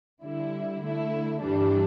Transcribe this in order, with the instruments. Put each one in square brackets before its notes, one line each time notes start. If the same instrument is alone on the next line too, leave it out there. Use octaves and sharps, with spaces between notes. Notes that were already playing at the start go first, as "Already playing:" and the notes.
[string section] D3 G3 E4
D3 A3 E4
G2 E3 G3 D4